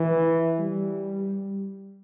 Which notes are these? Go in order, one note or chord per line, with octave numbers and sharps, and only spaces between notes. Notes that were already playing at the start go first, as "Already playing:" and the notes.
Already playing: E3
G3